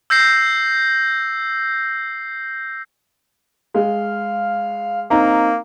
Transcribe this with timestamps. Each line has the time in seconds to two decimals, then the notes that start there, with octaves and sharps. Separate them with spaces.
0.10 E6 G6 A#6 C7
3.74 G#3 F5
5.11 A#3 C4 D#4 A#5